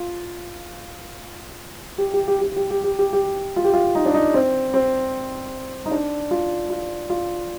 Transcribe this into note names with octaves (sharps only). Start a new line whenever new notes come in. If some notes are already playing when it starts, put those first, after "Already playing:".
Already playing: F4
G4
G4
G4
G4
G4
G4
G4
G4
G4
F4
G4
F4
D#4
D4
D#4
C4
C4
D#4
D4
F4
F4
F4